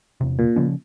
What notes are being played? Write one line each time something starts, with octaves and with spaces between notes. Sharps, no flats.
E2 C3
A#2
C#3 F3 C#4